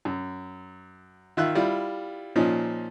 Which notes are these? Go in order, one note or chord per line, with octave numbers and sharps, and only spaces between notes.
F#2
D#3 F4 E5 E6 F#6
G3 E4 F4
A#2 F3 C#4 D#4